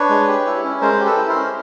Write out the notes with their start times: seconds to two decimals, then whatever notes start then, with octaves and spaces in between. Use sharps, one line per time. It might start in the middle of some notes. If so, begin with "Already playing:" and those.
Already playing: D4 B4 C#5
0.10 G#3
0.28 G4
0.46 E4
0.64 C#4
0.81 G#3 A#4 C5
1.00 G4
1.05 A4 B4
1.17 E4
1.29 A#4 C5
1.35 C#4